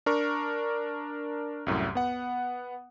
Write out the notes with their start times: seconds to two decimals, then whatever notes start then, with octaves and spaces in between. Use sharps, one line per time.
0.06 D4 A#4 C#6
1.66 C2 F#2 A2
1.95 B3 F#5